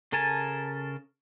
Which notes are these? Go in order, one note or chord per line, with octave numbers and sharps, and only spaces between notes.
C#3 A4 A#4 G#5 A5